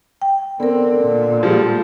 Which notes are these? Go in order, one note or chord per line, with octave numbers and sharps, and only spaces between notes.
G5
D3 B3 C4 A#4
A#2
F3 G3 G#3